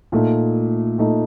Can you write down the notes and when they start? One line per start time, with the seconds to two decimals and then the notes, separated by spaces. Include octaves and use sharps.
0.12 A#2 A3 D#4
0.98 A#2 A3 D#4